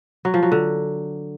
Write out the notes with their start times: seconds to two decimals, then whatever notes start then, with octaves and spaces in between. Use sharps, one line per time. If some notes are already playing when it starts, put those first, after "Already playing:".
0.25 F#3
0.34 F3
0.43 F#3
0.52 D3